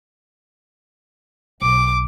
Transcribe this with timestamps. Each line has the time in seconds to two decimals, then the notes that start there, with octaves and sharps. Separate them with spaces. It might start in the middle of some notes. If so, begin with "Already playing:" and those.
1.62 B1 D6